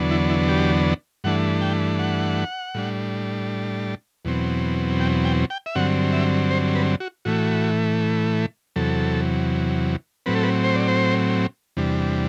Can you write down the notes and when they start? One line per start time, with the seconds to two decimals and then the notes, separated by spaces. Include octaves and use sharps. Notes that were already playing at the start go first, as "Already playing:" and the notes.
Already playing: E2 D3 F#3 B3 D4
0.11 E4
0.30 E4
0.49 G4
1.24 G2 E3 A3 D4 F#5
1.61 G5
1.99 F#5
2.75 A2 G3 D4
4.25 E2 B2 F#3 C4
5.00 G5
5.25 G5
5.50 G5
5.66 E5
5.75 G2 D3 F#3 C4 F#5
6.12 E5
6.51 C5
6.75 B4
7.00 F#4
7.25 A2 E3 A3 F#4
8.76 E2 C3 F#3 A4
10.26 A2 F#3 C4 B4
10.35 A4
10.43 B4
10.64 C5
10.75 D5
10.88 C5
11.77 E2 C3 G3 D4